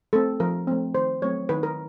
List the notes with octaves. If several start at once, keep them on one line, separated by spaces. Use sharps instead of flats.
A3 C4 A4
F3 A#4
A3 C4
D#3 C5
F#3 A3 C4 C#5
D#3 B4
A#4